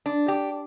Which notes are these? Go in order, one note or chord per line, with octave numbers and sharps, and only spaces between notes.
D4
G4